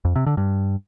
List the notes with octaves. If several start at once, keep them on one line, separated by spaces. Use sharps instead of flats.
F2
C3
D3
G2